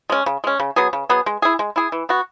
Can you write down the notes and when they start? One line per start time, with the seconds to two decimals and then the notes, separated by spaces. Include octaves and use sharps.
0.10 G#3 C#4
0.26 C#3
0.44 G#3 C#4
0.60 C#3
0.76 F#3 B3 G#4
0.93 C#3
1.09 F#3 B3 G#4
1.26 G#3
1.42 E4 G#4
1.59 G#3
1.76 E4 G#4
1.92 E3
2.09 B3 F#4